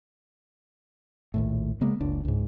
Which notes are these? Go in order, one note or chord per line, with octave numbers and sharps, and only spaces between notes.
A#1 D#2 A2
C#3 G#3 A#3 B3
F#1 C#2 D4
C#2 G#2